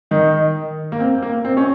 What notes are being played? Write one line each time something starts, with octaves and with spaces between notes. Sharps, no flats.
D#3 D#4
A#3
C4
A#3
C4
C#4